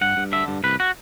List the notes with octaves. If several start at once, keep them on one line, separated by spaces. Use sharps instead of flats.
G2 F#5
G2
D3 E5
G2
C2 B4
F#4